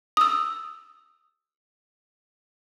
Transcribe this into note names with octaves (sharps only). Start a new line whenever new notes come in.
D#6 E6